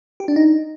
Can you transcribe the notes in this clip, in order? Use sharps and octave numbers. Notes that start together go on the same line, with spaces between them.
G4
D4
D#4